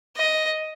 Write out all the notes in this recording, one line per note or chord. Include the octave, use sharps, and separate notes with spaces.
D#5